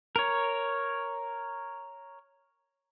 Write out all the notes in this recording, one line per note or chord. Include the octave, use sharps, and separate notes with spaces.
A#4 C#5